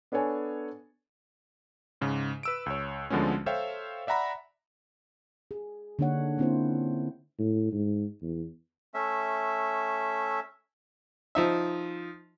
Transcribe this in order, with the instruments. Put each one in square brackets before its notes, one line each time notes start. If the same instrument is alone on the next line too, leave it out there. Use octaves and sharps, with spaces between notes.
[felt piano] B3 D4 A4 C#5 G#5
[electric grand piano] G#2 C#3
B4 E6 D7
C#2 C#5
D2 D3 F3 G#3 B3 C#4
A4 C5 C#5 E5 F5 G5
D5 E5 F#5 A#5 B5
[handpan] G#4
D3 A#3 D4 D#4 C#5 F#5
A#3 C4 C#4 E4 F4 C5
[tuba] A2
G#2
E2
[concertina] A3 C#4 E5
[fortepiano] F3 D#4 E5